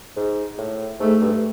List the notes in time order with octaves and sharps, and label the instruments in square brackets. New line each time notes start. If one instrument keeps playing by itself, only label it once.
[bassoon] G#2
A2
[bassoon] G#2 [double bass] A3
[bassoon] G2